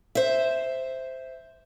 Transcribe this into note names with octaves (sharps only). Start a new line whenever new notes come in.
C5 E5